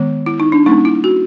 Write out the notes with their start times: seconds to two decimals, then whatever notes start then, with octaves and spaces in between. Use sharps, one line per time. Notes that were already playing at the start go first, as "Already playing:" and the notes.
Already playing: D#3 G#3 B3
0.26 E4
0.40 D#4
0.52 D4
0.66 G3 A#3 C#4 D#4
0.85 E4
1.04 F#4